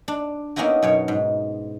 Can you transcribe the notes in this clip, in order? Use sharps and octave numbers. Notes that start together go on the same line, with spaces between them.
D4
A#3 B3 C#4 D#4 E4 F#4
F#2 B2 C#5
G#2